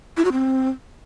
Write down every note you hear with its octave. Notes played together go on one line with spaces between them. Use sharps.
E4
F#4
C4